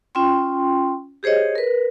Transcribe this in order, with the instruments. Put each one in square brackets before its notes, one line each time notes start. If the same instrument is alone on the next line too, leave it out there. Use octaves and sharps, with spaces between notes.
[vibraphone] C#4 F4 G5 C6
G4 G#4 C5 C#5 D#5
A#4 B4